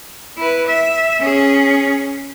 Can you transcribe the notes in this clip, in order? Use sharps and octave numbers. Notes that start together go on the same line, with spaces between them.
E4 B4
E5
C#4 G#4